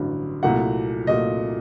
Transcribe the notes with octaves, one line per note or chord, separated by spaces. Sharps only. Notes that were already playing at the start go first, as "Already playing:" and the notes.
Already playing: A1 G2 D3 F#3
C2 A#2 F#3 A3 F#5
C2 A#2 F#3 A3 D#5